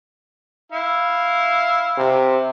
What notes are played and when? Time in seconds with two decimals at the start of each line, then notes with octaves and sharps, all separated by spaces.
0.72 E4 F5
1.97 C3